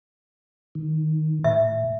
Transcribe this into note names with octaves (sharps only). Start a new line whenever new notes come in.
D#3
A2 E5